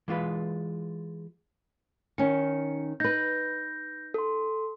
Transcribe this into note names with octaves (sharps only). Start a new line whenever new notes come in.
E3 G#3 F4 B4
D#3 C#4 C#7
D#4 B4 G6 A#6
A4 C6